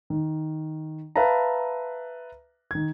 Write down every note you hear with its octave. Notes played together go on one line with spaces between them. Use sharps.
D#3
B4 E5 F5 A5 A#5
D#3 G#6